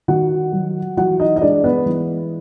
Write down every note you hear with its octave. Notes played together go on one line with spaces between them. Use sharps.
D#3 F#4 F#5
F#3
E3 F#4 F#5
D#4 D#5
D#5
G#3 D4 D5
B3 B4
E3